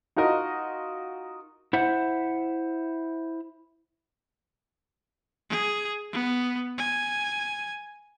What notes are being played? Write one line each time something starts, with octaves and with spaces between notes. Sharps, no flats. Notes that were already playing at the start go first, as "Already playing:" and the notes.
D#4 F4 F#4 A#4 D#5
E4 C5 E5 F#5
G#4
B3
G#5